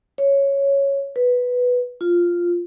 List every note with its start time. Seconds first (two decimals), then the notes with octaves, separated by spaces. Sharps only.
0.18 C#5
1.16 B4
2.01 F4